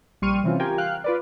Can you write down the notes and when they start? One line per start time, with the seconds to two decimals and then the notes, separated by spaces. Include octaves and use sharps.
0.22 A#1 G3 C6 C#6 F6 D#7
0.44 C3 E3 C4 C#4 F4
0.60 F4 G4 A#4 G5 G#5
0.78 F5 G5 F6 F#6
1.04 F4 B4 D5